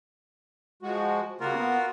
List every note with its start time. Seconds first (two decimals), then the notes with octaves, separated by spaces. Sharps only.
0.82 F3 G#3 F#4
1.40 C#3 G3 A#3 F4 F#4 A#4
1.55 B3